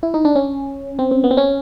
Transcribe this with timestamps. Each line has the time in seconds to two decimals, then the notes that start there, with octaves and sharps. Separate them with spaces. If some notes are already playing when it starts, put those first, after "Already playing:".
0.03 E4
0.14 D#4
0.25 D4
0.35 C#4
0.99 C4
1.11 C4
1.24 B3
1.31 C4
1.37 C#4